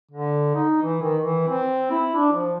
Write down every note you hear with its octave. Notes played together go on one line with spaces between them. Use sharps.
D3
D#4
E3
D#3
E3
C4
E4
D4
F3